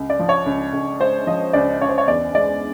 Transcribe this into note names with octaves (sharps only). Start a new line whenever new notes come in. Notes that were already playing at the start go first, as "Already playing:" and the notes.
Already playing: C#2
D5
F3
C#5
C#2
C#2
G#3 C5
F3 D#5
C#2 D5
C#2 C#5
C5
C#5
E2 D5
G#3 D5